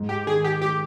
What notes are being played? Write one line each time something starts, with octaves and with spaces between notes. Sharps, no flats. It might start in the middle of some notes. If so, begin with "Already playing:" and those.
Already playing: G#2
G4
D#3 G#4
G4
G#3 G4